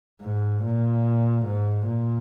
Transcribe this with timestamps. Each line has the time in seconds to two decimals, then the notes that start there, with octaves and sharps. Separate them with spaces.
0.22 G#2
0.64 A#2
1.46 G#2
1.87 A#2